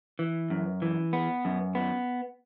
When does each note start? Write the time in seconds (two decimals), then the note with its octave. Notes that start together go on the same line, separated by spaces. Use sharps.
0.19 E3
0.50 F#2
0.82 E3
1.13 B3
1.45 F#2
1.75 B3